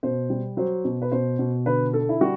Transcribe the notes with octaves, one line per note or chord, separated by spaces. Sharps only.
B2 C5
G3
F#3 C5
B2
B4
B2 C5
B2
D3 B4
D3 A4
E4
G3 F#4